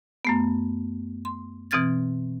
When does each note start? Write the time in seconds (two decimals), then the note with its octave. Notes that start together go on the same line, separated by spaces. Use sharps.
0.25 F#2 A3 B3
1.25 C6
1.71 B2 E3 C4 F6 G#6 A6